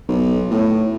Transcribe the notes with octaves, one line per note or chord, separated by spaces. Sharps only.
B1
A2